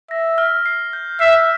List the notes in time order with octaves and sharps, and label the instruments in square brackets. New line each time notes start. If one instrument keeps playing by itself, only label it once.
[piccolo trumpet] E5 [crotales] A#6
[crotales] F6
C7
G6
[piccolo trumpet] E5 [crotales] C7